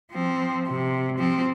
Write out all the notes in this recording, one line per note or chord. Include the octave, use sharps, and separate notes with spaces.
F3 C4
C3
F3 C4